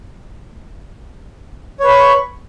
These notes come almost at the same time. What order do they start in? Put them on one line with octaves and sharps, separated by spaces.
C#5 B4 B5 C#6